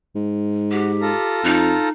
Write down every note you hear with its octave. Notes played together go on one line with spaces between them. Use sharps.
G#2
F#4 G4
F4 A4 A#5
F2 D#4